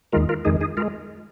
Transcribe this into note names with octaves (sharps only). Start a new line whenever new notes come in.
D#2 D#3 G#3 F4 A#4
F4 A#4
F2 D#3 G#3 D#4 G#4
D#4 G#4
G#3 F4 A#4